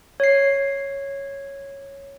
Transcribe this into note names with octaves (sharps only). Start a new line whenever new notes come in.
C#5 C7